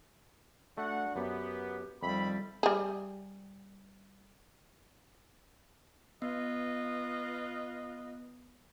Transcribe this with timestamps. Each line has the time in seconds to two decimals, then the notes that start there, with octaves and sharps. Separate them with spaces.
0.78 A3 D4 F#4 F#5
1.16 F#2 B3 G4
2.03 F2 D#3 G3 E5 B5
2.63 G3 G#4
6.22 B3 F4 B4 D#5